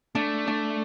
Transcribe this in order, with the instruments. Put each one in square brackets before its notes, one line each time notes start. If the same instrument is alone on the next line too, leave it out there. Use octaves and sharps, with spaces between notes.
[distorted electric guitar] A3 [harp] D4
[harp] D4